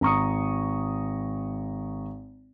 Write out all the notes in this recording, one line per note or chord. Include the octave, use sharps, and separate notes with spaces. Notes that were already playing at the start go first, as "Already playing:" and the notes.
G#1 A#5 C#6 D#6